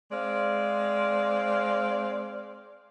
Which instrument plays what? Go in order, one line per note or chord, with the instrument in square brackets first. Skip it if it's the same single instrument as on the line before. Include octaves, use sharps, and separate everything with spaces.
[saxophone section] G#3 C4 C5 D5 F5